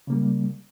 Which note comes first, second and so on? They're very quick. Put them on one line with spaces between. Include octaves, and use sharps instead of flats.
C#3 A#3 G3